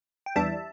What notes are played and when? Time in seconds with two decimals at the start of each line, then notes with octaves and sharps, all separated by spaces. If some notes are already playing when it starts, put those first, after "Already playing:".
0.26 G5
0.36 E2 E3 G3 D4 E5 A5